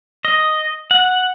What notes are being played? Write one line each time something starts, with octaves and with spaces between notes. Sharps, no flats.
D#5
F#5